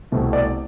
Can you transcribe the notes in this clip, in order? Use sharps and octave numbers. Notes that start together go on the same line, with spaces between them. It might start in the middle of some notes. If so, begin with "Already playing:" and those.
C2 B2 A3 C4
D5